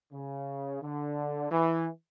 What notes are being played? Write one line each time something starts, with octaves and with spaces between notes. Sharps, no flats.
C#3
D3
E3